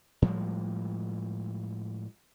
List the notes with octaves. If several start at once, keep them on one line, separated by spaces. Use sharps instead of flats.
A2 F3 G3 G#3